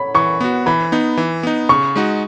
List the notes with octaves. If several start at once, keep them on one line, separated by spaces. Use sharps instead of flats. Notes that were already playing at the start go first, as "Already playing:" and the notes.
Already playing: C#5 B5
E3 C#6
B3 F#4
E3 B5
B3 D#4
E3
B3 D#4
C#3 C#6
G#3 D#4 F#4